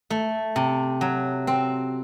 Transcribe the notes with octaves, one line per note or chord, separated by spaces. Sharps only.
A3
C3
F#3
C4